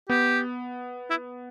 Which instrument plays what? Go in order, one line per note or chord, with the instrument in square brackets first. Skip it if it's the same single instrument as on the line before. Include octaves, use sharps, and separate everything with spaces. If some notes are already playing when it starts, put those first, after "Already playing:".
[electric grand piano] B3 [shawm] G4
[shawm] E4